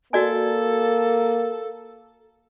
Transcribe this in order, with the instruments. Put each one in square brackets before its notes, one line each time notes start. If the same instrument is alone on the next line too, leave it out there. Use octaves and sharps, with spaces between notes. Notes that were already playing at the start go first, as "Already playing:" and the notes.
[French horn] A#3 [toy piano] F#4 D5 G#5 [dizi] A4